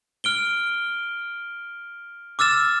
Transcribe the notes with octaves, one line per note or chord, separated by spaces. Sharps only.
F6 D7 G7
D6 E6 F6 A6 E7